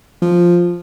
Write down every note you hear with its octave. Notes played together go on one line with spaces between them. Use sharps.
F3